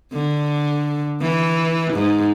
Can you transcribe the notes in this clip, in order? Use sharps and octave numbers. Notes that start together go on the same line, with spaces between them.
D3
E3
G#2